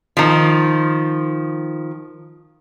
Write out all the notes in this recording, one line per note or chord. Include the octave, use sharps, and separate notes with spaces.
D#3 F3